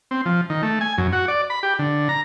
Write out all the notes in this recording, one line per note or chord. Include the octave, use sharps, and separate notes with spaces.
C4
F3
D#3
A3
G#5
F#2
F#4
D5
B5
G4
D3
A#5